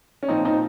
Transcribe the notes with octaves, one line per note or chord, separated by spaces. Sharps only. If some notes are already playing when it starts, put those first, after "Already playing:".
C#4
A#2 F3 C4 D#4
C4 D#4